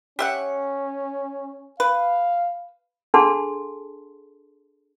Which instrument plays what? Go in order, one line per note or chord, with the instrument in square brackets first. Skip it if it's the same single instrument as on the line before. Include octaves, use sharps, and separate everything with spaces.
[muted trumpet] C#4 [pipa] G4 E5 F#5
[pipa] B4 [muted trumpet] F5
[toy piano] D4 G#4 A4 F#5 A5 C6